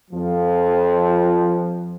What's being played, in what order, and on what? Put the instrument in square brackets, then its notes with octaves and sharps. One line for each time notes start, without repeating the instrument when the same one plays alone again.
[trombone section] F2 F3